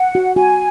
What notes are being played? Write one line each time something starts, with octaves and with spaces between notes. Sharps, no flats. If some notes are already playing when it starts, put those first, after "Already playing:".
Already playing: F#5
F#4
F#4 G#5